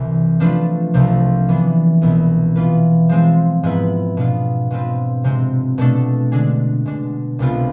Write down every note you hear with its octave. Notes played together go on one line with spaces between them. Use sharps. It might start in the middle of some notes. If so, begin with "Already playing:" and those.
Already playing: C2 C3 E3
F3 A3 D4 F4 B4
C2 C3 F3 A3
E3 B3 D4
C2 B2 B3 E4
E3 B3 F4 B4
F3 G#3 C4
G#2 G#3 B3 E4 B4
B2 B3 D4 F4
B2 G#3 C4 F4 B4
C3 G#3 C4
B2 A3 D4 A4
D3 G#3 D4 G#4
B2 G#3 D4
C2 C3 G#3 B3 F4